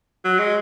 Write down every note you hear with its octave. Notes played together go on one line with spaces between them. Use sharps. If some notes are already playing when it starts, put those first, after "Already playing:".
F#3
G#3